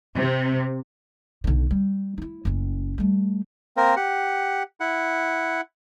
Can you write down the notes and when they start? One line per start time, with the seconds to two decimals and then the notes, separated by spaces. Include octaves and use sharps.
0.15 C3
1.44 B1 D3
1.71 G3
2.18 D#4 E4
2.45 F#1 C#4
2.98 G3 A3
3.77 A#3 C4 A#4
3.96 G4 F#5
4.80 E4 F#5